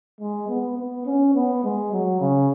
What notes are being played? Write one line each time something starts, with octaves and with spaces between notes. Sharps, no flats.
G#3
B3
B3
C#4
B3
G#3
F#3
C#3